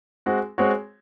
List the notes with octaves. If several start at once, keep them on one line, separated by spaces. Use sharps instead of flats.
G#3 C4 F#4
G#3 C4 F#4 C#5